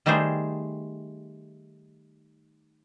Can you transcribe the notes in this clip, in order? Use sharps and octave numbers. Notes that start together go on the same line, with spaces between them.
D#3 G3 A3 G#4 C5